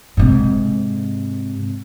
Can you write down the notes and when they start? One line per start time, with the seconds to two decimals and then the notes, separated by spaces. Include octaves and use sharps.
0.17 G#2 C3